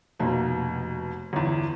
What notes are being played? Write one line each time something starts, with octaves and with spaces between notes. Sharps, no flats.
F1 B2 A#3
G1 E2